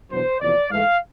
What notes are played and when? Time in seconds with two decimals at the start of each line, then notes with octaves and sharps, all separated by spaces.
0.11 E2 B2 F#3 B3 D4 C5
0.40 E2 C3 F3 A#3 D5
0.71 G#2 E3 A3 F5